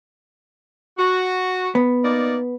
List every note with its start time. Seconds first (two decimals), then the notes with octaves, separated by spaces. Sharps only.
0.98 F#4
1.75 B3
2.03 A#3 D#4 D5